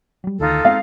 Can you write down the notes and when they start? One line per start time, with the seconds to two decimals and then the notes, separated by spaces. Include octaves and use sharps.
0.24 F#3 G3
0.40 D2 D#3 D#4 F4 A4
0.65 G#3 C4 F5